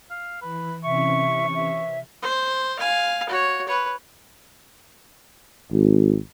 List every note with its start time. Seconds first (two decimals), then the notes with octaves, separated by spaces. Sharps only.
0.10 F5
0.42 E3 B4
0.84 C3 E3 C#4 E5 C#6
1.55 E5
2.22 C5
2.79 F5 G#5
3.29 F#4 C#5
3.68 B4 C#5
5.72 G#1